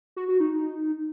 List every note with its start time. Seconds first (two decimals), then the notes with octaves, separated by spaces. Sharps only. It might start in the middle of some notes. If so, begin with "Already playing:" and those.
0.16 F#4
0.28 F#4
0.40 D#4